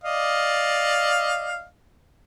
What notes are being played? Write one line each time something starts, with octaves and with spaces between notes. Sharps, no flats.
D5 D#5 F5